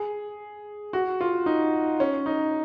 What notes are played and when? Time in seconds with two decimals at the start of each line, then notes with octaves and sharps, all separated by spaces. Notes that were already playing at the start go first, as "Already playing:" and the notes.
Already playing: G#4
0.93 F#4
1.21 F4
1.46 D#4
2.00 C#4
2.26 D#4